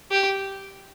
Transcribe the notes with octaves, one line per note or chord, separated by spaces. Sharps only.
G4